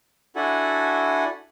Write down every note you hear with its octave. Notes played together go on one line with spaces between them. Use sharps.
D4 E4 F#4 A4 F#5 G#5